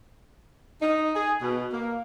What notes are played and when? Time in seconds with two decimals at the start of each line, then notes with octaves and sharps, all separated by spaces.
0.81 D#4
1.15 G#4
1.41 B2
1.72 A#3